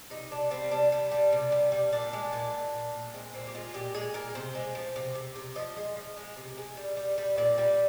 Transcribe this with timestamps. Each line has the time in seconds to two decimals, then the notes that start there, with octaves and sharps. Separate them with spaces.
0.10 C3 D#4
0.31 C3 D4
0.51 G3 C4
0.71 C3 D4
0.92 G3
1.12 G3
1.32 C3
1.52 G3
1.72 G3
1.93 A#2 D4
2.13 G#3
2.33 A#2
2.53 A#2
2.74 A#2
2.94 A#2
3.14 G#3 C4
3.34 A#2 C4
3.47 G4
3.54 G#3 F4
3.74 A#2 G4
3.94 G#3 G#4
4.14 A#2 A#4
4.35 C3 C5
4.55 G#3
4.75 F3
4.96 C3
5.15 C3
5.36 C3
5.56 F3 D#5
5.77 G#3
5.96 F3
6.17 G#3
6.37 C3
6.57 G#3
6.77 G3
6.97 G3
7.18 G3
7.38 A#2 D5
7.58 G3